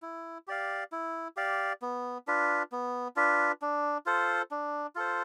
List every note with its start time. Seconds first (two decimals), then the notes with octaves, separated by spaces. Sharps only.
0.02 E4
0.48 G4 D5 F5
0.92 E4
1.37 G4 D5 F5
1.82 B3
2.27 D4 F4 B4
2.72 B3
3.16 D4 F4 B4
3.62 D4
4.06 F4 A4 C5
4.51 D4
4.95 F4 A4 C5